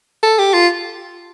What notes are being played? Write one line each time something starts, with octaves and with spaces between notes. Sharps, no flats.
A4
G4
F4